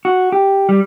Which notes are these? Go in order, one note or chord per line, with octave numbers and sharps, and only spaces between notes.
F#4
G4
G3